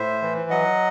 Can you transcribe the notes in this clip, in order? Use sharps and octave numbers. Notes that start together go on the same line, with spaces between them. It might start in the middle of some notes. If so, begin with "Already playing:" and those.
Already playing: A2 C5 E5
E3
F#3 D#5 F#5